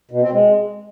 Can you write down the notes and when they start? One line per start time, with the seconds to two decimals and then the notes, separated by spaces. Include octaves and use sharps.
0.11 B2
0.22 C4
0.32 G#3